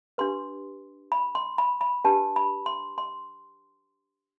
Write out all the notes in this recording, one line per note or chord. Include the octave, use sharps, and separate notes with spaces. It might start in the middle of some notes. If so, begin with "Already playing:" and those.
D4 G4 B4 C6
B5
C6
B5
B5
D4 G4 B4 A5
B5
C6
C6